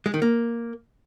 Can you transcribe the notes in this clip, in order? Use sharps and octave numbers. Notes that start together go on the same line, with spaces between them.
G#3
D#3
A#3